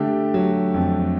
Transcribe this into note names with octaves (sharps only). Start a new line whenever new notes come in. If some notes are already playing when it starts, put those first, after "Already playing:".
Already playing: D3 A3 G4
F#3
F2